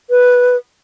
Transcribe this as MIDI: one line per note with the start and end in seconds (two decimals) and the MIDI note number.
0.10 0.56 71